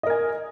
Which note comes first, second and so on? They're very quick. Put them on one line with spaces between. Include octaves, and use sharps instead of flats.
D#5 A#4 G#5